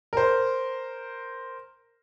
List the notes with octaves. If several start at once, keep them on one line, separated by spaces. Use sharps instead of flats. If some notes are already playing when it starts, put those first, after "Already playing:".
A#4 C5